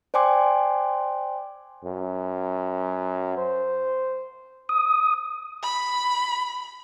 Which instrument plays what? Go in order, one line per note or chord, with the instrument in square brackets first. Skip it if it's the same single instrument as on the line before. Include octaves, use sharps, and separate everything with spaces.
[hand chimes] C5 D5 G5 G#5 C6 D6
[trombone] F#2
C5
[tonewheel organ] D#6
[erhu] B5